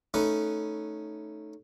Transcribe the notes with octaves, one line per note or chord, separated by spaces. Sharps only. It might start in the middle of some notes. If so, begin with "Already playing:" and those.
A3 C#4 D#4 B4